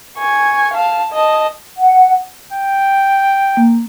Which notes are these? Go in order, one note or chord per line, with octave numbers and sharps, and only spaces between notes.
G#5 C#6
F5 A5
D#5 A5
F#5
G5
A#3